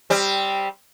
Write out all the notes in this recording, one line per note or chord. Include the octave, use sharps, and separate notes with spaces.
G3 C4